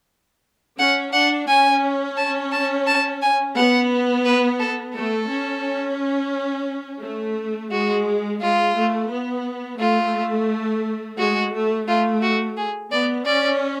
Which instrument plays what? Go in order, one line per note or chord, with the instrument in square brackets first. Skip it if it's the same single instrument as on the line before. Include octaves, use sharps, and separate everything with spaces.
[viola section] C#4 [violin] F#5
[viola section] D4 [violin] F#5
[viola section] C#4 [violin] G#5
[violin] A5
A5
A5
G#5
[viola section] B3 [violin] F#5
[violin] B4
A4
[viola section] A3 [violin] A4
[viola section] C#4
A3
[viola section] G#3 [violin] F#4
[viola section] G#3 [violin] F4
[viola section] A3
B3
[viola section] A3 [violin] F4
[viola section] G#3 [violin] F#4
[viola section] A3
[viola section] A3 [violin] F4
[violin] F#4
G#4
[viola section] B3 [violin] D5
[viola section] C#4 [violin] D5